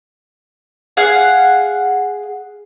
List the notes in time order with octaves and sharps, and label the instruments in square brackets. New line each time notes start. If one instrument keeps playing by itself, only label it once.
[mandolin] G#4 F5 F#5